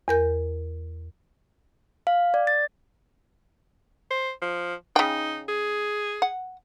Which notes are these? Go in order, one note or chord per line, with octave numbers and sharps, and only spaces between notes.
E2 A#4 G6
F5
D5
A6
C5
F3
C#3 D#4 G5
G#4
F#5